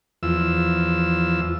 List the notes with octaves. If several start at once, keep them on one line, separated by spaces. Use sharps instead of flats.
E2 F3 E6